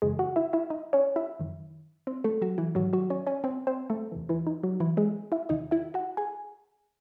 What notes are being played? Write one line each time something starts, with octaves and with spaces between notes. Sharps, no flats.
F#2 C#3 E3 G#3 G#4
F#4 F#5
E4 E5
E4 E5
D#4 D#5
C#4 C#5
E4 E5
F#2 D#3
C4 C5
A3 A4
F#3 F#4
E3 E4
G#2 D#3 F#3 F#4
F#3 F#4
C#4 C#5
C#4 C#5
C4 C5
C4 C5
A3 A4
E2 C3 E3
E3 E4
D#4
F#3 F#4
E3 E4
G#3 G#4
E4 E5
E2 C3 D#3 D#4 D#5
E4 E5
F#4 F#5
G#4 G#5